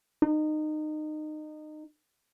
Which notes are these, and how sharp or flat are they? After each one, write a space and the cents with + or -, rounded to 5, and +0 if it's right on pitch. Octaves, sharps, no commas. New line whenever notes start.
D#4 -25